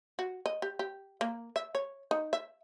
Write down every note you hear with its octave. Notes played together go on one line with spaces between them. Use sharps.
F#4
D#5
G4
G4
A#3
E5
C#5
D#4
E5